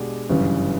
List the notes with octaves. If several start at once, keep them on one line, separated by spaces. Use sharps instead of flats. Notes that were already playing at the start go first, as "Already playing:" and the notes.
Already playing: B2 G#3 B3 D4 G4
G1 F#2 C#3 E3 G3